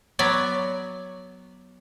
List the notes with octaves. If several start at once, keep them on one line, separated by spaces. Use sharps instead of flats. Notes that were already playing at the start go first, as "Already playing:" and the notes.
F#3 B3 C#5 D5